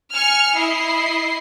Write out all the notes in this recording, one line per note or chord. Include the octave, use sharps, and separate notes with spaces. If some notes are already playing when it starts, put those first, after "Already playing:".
G#5 F6 C#7
E4 D#5 C7